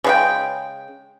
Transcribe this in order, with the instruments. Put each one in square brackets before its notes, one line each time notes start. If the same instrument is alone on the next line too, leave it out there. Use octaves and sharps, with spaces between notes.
[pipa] C#3 G#3 G5